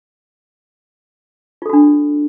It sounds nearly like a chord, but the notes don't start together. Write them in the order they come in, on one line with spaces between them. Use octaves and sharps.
F4 A4 F#4 D4